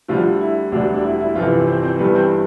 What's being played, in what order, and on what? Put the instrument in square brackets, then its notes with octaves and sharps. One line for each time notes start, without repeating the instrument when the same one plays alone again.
[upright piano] D2 D3 F3 G3 F4
E4
E1 D2 D3 G3 D4
D4
E4
E4
G1 F2 C3 E3 F3 F4
C4 C5
C4 C5
G1 G2 E3 G3 B3 B4
C4 C5